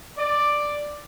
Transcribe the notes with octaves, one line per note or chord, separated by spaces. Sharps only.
D5